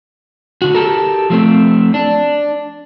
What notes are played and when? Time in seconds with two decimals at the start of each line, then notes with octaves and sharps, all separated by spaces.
0.62 D3 F#4
0.75 G4 A4 A#4
1.30 F3 A3 C4
1.94 D4